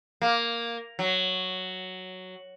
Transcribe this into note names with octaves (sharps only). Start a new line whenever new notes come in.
A#3
F#3